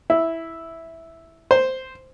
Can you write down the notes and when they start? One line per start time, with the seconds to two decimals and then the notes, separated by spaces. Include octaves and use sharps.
0.10 E4
1.51 C5